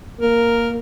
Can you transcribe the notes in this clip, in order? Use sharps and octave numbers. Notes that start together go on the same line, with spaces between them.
A#3 A#4